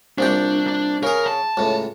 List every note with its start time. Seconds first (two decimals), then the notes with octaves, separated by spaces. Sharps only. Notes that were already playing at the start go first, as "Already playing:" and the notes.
0.18 C2 A#2 D4 G4
0.67 D4
1.03 C#3 G#4 A#4
1.27 A5
1.57 C#2 A2